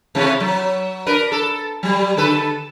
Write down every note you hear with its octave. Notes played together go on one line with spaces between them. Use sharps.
C3 E3 A3
F#3
D4 A#4 B4
A4
F#3 G3
D3 A4 B4